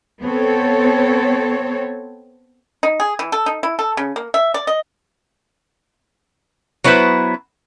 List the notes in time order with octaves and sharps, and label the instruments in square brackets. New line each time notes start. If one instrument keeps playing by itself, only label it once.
[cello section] B3 C4 A4 C#5
[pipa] D#4
G#4
E3
A4
D#4
E4
A4
C#3
A#3
E5
D5
D#5
[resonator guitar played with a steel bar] F#3 B3 E4 B4 C5